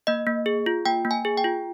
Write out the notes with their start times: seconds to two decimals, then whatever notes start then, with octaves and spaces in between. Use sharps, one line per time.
0.07 A#3 D#5
0.27 A#3
0.46 G#4
0.66 F4
0.85 A#3 G5
1.05 A#3
1.11 G#5
1.25 G#4
1.38 G5
1.44 F4